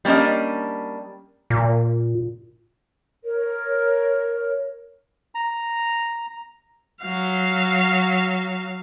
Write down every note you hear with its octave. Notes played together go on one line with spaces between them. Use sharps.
G3 A#3 C#4 D4 D#5
A#2
A#4 C#5
A#5
F#3 F5